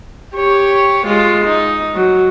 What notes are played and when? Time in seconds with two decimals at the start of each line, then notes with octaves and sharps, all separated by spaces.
0.35 G4 C#5
1.07 G#3 F4
1.45 D#4
1.96 F#3